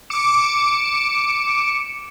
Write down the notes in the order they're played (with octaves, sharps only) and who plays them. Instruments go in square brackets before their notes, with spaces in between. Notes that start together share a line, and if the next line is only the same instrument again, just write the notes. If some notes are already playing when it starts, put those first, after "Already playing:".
[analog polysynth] D6 C#7 D7 E7